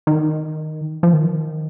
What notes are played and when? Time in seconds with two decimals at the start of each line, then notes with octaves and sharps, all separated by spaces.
0.07 D#3
1.03 F3
1.13 D#3